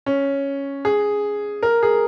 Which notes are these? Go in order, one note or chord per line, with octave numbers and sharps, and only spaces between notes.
C#4
G#4
A#4
G#4